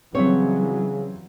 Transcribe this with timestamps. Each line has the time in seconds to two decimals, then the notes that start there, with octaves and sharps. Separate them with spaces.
0.15 C#3 E3 F#3 G3 C4 E4 C#5